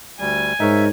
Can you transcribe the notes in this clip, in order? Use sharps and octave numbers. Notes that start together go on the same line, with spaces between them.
D2 G3 G#5
G#2 D#4 A#4 C#5 E5